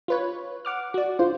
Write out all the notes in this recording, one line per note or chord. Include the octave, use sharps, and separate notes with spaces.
F4 B4 C#5
F#5 D6 F6
F#4 D5
F4 C5